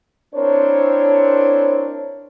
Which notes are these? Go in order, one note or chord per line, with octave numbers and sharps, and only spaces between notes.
C4 D4 E4 A#4 C5 C#5